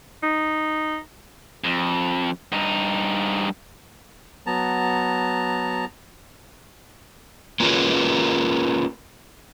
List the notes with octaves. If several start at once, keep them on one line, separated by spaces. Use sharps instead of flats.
D#4
F2
G2 D#4
F#3 B3 A5 A#5
A#3 C#4 F4 G#4 A#4 B4